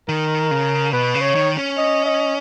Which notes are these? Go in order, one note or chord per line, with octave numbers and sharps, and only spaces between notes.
D#3 A#4
C#3
B2 B4
C#3
C#5
D#3
C#4
D#5
D#5